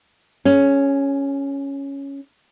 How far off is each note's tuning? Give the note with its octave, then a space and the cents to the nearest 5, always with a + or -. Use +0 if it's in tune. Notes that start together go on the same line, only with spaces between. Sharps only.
C#4 +0 G#4 +35